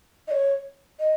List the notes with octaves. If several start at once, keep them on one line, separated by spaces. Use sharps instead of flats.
D#5
C#5
D#5